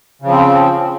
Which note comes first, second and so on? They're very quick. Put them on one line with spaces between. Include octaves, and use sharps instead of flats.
C#3 F3 C4